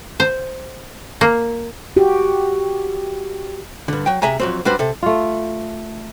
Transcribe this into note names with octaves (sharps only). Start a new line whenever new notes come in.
C5
A#3
F#4 G4
G2 D3
F#3 G5
C3 G#4 E5 G#5 A#5
F2 F#3 C4
G3 D4 F#4 B4 C5
C3 A4
A3 F4